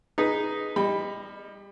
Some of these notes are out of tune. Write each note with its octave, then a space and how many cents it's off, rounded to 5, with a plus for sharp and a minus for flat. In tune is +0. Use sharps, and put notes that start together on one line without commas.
D#4 +0 G#4 +0 B4 +0
G3 +30 D#5 +0 B5 +0